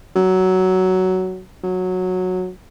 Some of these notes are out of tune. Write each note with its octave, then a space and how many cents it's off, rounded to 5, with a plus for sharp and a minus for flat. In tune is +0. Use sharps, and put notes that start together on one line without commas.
F#3 +10
F#3 -10